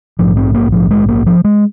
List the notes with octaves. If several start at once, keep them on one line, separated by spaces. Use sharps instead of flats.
A#1 G#2 F3
C4
A#3
F3
G#3
A#3
F3
G#3